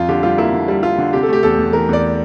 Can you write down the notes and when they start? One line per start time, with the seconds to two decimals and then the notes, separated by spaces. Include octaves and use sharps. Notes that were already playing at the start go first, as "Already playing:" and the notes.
Already playing: F2 F4
0.09 D3 G4
0.23 G3 F4
0.38 A#3 E4
0.53 D3
0.68 G3
0.83 G3 F4
0.98 D3
1.13 C3 G4
1.23 A4
1.29 A3 G4
1.43 E2 A4
1.58 E2
1.73 E3 A#4
1.89 E2 D5